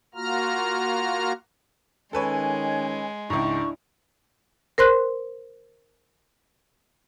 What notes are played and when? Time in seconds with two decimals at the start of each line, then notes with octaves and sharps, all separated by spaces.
0.15 A#3 F4 F#4 A#5 F6
2.13 D#3 G#3 C#4 A4 B4 C#5 G#5
3.30 C#2 G#2 D4 E4 C#6
4.78 A#4 C5 C6 F#6